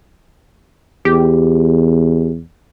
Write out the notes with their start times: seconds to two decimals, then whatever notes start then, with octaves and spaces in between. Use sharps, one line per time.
1.05 E2 G4